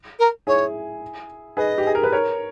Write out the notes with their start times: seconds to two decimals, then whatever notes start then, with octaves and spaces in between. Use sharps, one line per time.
0.19 A#4
0.47 E4 G#4 C#5
1.57 G#4 B4 D#5
1.78 G4
1.87 G#4
1.95 A#4
2.03 B4
2.12 A#4 C#5